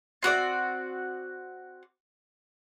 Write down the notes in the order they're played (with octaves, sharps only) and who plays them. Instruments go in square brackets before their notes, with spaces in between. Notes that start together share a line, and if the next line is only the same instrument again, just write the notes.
[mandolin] C4 F#4 C#5 D5